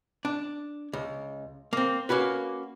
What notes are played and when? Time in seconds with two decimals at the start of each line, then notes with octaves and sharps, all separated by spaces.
0.25 D4
0.93 C#2
1.73 A#3 C4
2.09 A#3 C#4 F#4 B4